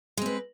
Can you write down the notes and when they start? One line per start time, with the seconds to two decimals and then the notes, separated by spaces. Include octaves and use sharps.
0.17 G#3
0.22 C4
0.26 B4